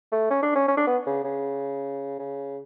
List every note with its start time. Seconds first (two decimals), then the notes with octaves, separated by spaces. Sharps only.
0.12 A3
0.30 C#4
0.42 D4
0.55 C#4
0.68 C#4
0.77 D4
0.87 B3
1.06 C#3
1.24 C#3
2.19 C#3